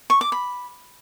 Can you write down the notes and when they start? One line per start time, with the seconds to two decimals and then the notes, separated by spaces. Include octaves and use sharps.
0.10 C#6
0.21 D6
0.32 B5